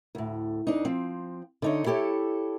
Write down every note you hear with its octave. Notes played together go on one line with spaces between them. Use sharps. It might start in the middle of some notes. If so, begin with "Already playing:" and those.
D2 A2
F2 D4 D#4
F3 C4
D3 D#4 C#5
E4 G4 A4 C#5